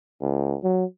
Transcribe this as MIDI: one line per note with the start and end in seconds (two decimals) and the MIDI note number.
0.22 0.57 37
0.64 0.85 54